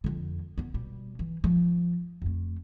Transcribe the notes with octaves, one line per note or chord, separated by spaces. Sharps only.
F2 D3
B3 E4
B2 G3
E3
F3
F2 A3